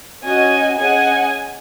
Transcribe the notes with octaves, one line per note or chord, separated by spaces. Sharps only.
C#4 F#4 D#5 G#5
C#4 G#4 D#5 F#5 G#5